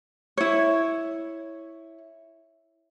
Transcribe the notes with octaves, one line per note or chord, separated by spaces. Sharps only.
E4 C#5